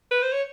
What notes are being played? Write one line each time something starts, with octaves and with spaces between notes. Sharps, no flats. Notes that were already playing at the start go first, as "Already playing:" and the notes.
B4
C5
C#5